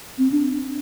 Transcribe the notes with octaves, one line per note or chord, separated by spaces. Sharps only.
C4
D4